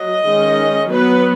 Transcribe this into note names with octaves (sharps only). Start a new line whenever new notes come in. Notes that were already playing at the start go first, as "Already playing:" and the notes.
Already playing: F#3 D#5
D#3 G#3 C#4
F#3 B3 B4